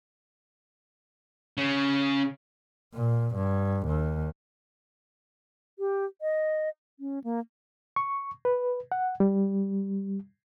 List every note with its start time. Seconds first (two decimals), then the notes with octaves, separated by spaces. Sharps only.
1.57 C#3
2.95 A#2
3.35 G2
3.87 D#2
5.79 G4
6.22 D#5
7.00 C#4
7.24 A#3
7.96 C#6
8.45 B4
8.92 F#5
9.20 G3